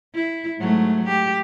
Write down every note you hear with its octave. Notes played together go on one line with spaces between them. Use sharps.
E4
G#2 F#3 A3
G4